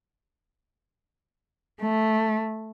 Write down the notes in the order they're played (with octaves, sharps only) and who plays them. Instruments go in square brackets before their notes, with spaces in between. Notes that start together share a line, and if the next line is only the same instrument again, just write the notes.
[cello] A3